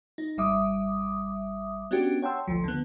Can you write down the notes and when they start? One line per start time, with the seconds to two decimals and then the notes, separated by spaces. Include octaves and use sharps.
0.18 D#4
0.37 G#1 G3 E5 D6 D#6
1.91 B3 C#4 D4 F#4 G4
2.22 C#5 F#5 G5 A5 C6 E6
2.48 A1 D2 F3
2.64 D3 B3